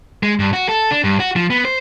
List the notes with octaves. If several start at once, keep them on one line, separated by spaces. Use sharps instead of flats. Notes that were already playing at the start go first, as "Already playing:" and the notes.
G#3
G2
F#4
A4
D4
G2
F#4
F3
B3
C5